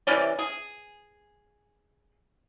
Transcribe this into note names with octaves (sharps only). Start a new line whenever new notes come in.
C3 E3 C#4 D5
G#4